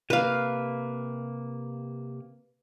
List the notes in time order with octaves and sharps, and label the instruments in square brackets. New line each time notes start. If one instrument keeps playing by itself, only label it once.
[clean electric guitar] C3 A#3 [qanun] B4 F5